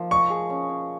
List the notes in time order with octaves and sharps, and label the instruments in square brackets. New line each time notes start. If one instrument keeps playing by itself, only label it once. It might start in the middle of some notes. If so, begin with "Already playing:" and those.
Already playing: [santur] F3 A#3 D#4
[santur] D#5 [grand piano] C#6
[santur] G#4
C#4
C#4